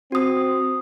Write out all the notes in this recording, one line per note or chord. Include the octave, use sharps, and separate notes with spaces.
C4 F#4 D#6